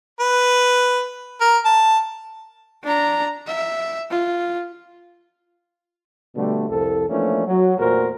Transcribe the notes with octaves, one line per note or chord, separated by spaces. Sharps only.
B4
A#4
A5
D4 A#5
E5
F4
B2 D3 G3 A3
C2 F2 A4
E3 F3 A3 A#3 C#4 D4
F#3
E2 A#2 A3 F#4 A#4 C5